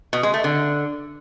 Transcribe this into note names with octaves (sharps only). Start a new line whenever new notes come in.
B2
G#3
A3
D3